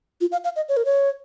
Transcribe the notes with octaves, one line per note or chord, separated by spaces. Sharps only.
F4
F5
F5
D#5
C#5
A#4
C#5